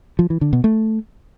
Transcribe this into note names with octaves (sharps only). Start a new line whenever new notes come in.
F3
E3
D3
B2
A3